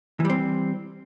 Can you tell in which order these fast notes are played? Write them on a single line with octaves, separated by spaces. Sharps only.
E3 G3 C4